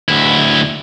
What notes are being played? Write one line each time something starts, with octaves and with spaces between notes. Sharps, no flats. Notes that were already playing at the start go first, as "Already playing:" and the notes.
D2 E4